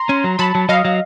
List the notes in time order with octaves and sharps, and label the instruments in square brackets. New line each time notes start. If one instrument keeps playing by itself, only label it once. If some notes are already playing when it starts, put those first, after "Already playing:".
Already playing: [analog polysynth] A#5 C6
[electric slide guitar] C#4
F#3
[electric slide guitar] F#3 [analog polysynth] A5 B5
[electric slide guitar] F#3
[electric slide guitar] F#3 [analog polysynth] D#5 F5
[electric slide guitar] F#3